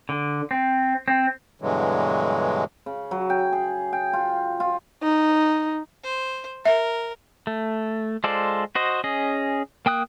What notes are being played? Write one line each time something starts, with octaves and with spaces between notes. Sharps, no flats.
D3
C4
C4
G2 B2 D3 E3 F#3 G#3
C#3
F#3
G5
G#4
G5
F4
F4
D#4
C5
A#4 E5
A3
G#3 F4 A4 C5 D5
F#4 C5 D#5
C#4 G#4 D#5
A#3 G5 D#6 F#6